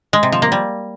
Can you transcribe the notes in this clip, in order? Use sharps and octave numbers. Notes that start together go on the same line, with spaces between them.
G#3
C3
F3
A#3
G3